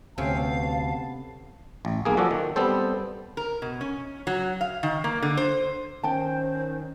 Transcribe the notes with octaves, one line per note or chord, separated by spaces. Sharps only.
D2 C3 B3 C#4 G4 F5 A5
A1
B1 A#3 G#4
F3 F#4 A4 D5
D#3
G3 B3 C4 A4 C5
A#4
B2
C#4
F#3
F5
D#3
A#3
D3
C5
D#3 C#4 C5 G5 A5